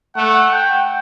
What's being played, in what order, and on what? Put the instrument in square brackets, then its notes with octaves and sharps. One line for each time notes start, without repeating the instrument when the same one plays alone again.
[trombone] A3 [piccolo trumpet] F#5
[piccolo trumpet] G5